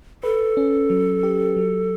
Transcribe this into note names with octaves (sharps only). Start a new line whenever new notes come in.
A4 B4
C#4
F#3
G4
F#3